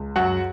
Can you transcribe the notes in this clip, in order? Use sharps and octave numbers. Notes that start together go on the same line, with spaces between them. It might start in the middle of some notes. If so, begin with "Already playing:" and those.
Already playing: C#2
F#2 F#4 F#5